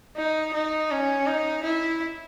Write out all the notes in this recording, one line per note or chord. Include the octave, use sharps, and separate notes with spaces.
D#4
D#4
C#4
D#4
E4